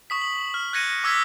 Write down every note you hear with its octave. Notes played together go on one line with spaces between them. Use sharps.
C#6 D#6 B6
F#7
F6
F#6 G#6 A#6 C#7 D#7
D6 E6 G#6 A#6 B6